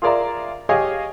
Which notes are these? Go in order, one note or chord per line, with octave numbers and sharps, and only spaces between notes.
F4 G#4 A#4 D5 E5 A#5
G4 G#4 C#5 D#5 F5 G#5